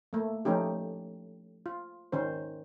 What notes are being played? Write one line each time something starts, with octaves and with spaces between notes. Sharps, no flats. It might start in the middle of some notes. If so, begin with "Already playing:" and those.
A3 A#3
F3 A3 C#4 D#4 G4
F4
D#3 C#4 C5